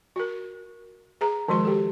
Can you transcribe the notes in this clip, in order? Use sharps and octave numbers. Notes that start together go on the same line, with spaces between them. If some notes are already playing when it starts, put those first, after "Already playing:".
F#4 A#4
G#4 B4 A#5
D#3 F3 G#3 F#4 C6
G4 A4